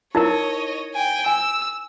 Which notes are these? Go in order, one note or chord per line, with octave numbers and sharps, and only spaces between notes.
D#4 E4 A#4 C#5 D#5
G5 G#5
G#5 E6